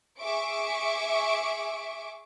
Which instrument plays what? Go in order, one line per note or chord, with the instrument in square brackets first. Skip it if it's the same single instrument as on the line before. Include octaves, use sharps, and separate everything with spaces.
[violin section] G#4 E5 C#6 D6 D7